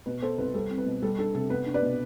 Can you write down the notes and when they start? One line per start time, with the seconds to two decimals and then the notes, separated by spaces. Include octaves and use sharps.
0.06 B2 B4
0.22 B3 A4 C5
0.38 C2 B4
0.54 G3 A4
0.70 C4
0.78 B4
0.86 B2
1.02 G3 A4
1.18 D4 A4
1.34 C3 A4
1.50 B3 B4
1.66 D4
1.74 B4 D5
1.82 B2